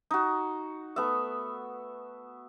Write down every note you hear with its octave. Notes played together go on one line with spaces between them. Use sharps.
D#4 F#4
A3 B3 E5